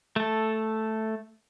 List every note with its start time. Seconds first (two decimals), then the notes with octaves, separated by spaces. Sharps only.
0.16 A3 A4